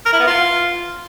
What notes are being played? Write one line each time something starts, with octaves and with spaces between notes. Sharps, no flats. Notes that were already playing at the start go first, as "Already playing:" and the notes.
A#4
E4
B3
F4